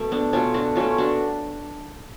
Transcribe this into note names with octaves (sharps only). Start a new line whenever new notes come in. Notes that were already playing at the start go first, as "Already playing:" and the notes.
Already playing: B2 A3
B3 D4
B2 A3 C#4 F4
D4 F#4
B2 A3 C#4 F4
D4 F#4